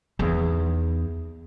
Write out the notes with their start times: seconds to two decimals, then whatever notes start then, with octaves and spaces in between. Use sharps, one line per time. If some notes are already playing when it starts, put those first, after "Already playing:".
0.19 E2 D#4